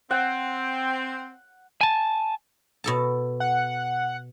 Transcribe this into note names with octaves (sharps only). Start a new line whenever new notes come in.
C4 F#5
G#5 A5
B2 A4 A5
F#5